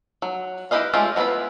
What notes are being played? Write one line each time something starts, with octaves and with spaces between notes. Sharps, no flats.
F#3
E4 G4 B4 D#5 F5
G#3 A3 C#4 F4 G4
F#3 B3 E4 F4 B5